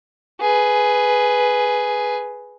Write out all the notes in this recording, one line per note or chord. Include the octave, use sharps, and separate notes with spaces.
G#4 B4